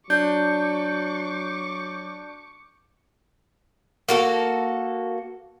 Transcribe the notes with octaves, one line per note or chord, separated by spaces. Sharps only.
F#3 D4 C#6 D6 G6
A#3 F#4 A4